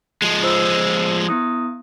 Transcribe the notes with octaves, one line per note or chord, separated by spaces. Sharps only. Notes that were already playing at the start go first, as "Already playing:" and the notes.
F3 G#3
F4 C5 E6
B3 E4 D#6